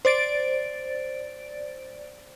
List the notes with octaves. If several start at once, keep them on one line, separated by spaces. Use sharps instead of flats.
C5 D5 A6 D7